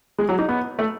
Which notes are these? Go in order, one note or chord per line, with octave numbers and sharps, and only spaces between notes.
G#3
F#3
D#4
B3
A3